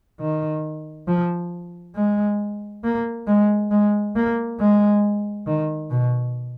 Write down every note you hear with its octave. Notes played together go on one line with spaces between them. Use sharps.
D#3
F3
G#3
A#3
G#3
G#3
A#3
G#3
D#3
B2